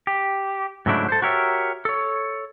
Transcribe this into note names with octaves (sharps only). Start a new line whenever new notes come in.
G4
G#2 C#3 F#3 A3 D4 E4
A4 C5
F#4 G4 A#4 C#5 E5
A4 C#5